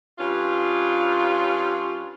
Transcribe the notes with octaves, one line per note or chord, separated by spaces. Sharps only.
G2 C#4 F4